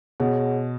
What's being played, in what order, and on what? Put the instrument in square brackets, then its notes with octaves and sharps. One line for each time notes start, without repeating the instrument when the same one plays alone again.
[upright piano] B2 [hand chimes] G#4 C#5 F#5